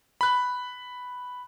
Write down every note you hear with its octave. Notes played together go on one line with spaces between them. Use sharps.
B5 F#6